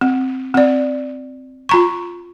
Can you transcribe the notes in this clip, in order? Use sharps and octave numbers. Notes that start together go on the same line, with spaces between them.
C4
C4 D5
F4 A#5 C#6